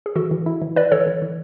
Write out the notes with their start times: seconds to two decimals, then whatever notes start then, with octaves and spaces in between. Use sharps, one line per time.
0.06 G#4
0.16 E3 F#4 A4
0.31 E3
0.46 E4
0.62 E3
0.76 E4 B4 D5
0.92 E3 A4 C#5
1.07 E3
1.22 E3